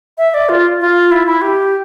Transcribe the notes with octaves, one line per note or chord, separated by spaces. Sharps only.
E5
D5
F4
F4
E4
E4
G4